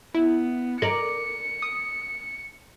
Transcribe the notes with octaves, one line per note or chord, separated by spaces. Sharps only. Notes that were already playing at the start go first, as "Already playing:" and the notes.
B3 E4
A#4 D5 C#7
D#6